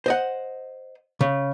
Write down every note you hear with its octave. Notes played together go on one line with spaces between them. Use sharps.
C5 D#5 F#5
C#3